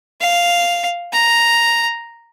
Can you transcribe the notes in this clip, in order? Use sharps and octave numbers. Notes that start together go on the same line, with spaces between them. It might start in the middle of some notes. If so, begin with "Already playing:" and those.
F5
A#5